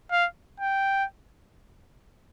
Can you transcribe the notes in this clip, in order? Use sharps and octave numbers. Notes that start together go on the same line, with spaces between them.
F5
G5